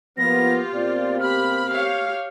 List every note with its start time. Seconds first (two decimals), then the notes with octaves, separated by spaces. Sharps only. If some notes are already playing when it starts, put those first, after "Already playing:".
0.18 F3 A#3 B3 F4 G4 A#6
0.74 B2 A#3 C4 D5
1.20 G4 B5 F6
1.70 G4 C#5 F5